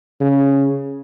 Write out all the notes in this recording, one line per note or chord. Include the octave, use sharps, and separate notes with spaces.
C#3